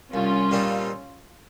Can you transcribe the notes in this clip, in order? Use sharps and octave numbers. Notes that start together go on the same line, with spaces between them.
C2 C#4 F4
A#2 G3 C4 D#4